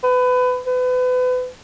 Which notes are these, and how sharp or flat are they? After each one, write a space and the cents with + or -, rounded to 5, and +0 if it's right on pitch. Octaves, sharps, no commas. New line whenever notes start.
B4 +25
B4 +35